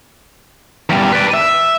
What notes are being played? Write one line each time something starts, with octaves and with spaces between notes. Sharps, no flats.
E2 G3
B4 D5
E5